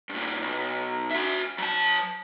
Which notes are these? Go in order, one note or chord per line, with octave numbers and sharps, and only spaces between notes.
G2 A#2
B1
F#4 E5
F#3 A5